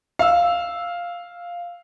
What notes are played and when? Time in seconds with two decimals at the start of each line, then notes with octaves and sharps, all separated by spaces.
0.19 F5 E6